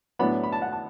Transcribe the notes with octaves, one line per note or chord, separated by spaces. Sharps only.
A2 F#3 B3 D4 B5
B5
A5
F#5
A5